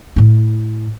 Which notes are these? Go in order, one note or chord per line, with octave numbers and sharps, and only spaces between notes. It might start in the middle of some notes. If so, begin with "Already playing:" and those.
A2 E4